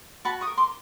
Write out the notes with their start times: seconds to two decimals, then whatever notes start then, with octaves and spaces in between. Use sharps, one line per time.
0.25 F#4 A5 B5
0.41 C#6 D#6
0.47 A#4
0.57 C6 D6